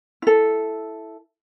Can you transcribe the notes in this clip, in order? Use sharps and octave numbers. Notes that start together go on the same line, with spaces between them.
E4 A4